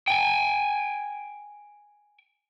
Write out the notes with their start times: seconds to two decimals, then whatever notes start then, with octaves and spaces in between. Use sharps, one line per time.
0.08 G5 G#5